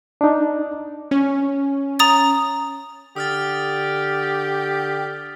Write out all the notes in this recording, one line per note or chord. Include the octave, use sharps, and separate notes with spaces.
D4 D#4
C#4
A#5 D#6 A6
D3 G4 D#6 F6 A6